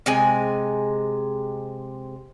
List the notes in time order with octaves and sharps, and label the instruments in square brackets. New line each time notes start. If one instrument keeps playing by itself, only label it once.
[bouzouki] C3 G#3 G#5